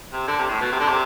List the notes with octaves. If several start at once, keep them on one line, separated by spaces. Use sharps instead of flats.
C3
D3
C3
A2
B2
C3
D3
C3